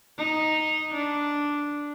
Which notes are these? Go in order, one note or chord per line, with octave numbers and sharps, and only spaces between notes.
D#4
D4